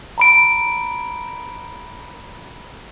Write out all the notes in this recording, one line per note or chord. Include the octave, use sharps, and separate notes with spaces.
A#5 B5 D7